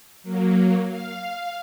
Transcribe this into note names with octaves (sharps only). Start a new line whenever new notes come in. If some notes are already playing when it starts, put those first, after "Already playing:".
F#3 A#3
F5